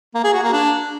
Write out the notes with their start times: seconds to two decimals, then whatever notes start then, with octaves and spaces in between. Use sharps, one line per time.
0.14 A#3
0.24 G#4
0.33 F#4
0.43 A#3
0.53 D4